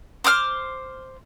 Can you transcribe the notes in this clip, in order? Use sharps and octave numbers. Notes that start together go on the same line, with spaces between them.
C5 D6 D#6 F6